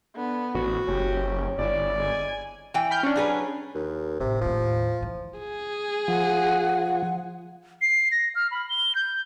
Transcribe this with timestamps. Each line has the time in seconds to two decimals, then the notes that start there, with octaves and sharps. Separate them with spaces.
0.16 D3 B3
0.55 A1 D2 F#4
0.88 F#1 C#4 G4
1.58 G1 E4 D5
1.99 G#3 G#5
2.74 E3 G5
2.91 B5 F6 G6
3.03 C#4 D4
3.16 F#3 G#4 B4
3.74 D#2
4.20 A1 C3
4.41 D#2 A2 F3
5.01 C#3 E3
5.38 G#4
6.08 F3 F#5
7.82 C7
8.12 A#6
8.35 F6
8.51 B5
8.69 G7
8.95 G6